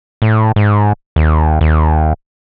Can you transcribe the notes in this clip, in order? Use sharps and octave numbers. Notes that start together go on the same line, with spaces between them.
A2
G#2
D#2
D#2